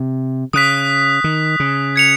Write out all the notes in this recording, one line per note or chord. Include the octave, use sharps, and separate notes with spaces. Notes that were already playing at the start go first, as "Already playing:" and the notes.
Already playing: C3
C#3 D#6 F#6 B6
D#3
C#3
G#6 C#7 F7